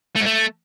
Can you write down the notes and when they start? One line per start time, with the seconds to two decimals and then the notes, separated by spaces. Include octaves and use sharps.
0.16 A3
0.21 G#2
0.26 A3